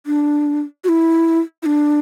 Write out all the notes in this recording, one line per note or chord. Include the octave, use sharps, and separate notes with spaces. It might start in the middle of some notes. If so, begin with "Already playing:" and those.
D4
F#4
E4
E4
D4